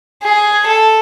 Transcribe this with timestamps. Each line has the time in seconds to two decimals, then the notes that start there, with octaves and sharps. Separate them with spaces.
0.23 G#4
0.66 A4